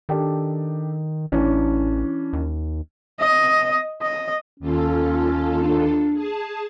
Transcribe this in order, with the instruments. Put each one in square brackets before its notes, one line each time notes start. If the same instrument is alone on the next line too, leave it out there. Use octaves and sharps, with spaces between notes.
[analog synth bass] D#3 [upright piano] D4 G4 A4
[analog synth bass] A1 [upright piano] E3 C#4 D4
[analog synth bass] D#2
[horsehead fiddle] D#5
D#5
[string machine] D#2 F4 A4 [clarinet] C#4
[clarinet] D4
[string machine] G#4 A5